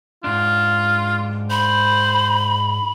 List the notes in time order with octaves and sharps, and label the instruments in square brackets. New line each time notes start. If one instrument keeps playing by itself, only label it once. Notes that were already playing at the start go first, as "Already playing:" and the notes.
[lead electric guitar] G#2 D4 [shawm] F4
[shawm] C5 [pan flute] B5